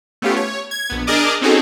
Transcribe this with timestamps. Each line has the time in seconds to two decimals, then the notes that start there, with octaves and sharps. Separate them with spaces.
0.22 A3 B3 C#4 F4 G4
0.36 C#5
0.71 G#6
0.90 A#1 B3
1.07 D4 G#4 A#4 D5 D#5 D6
1.41 C4 C#4 D#4 F#4 G#4 A4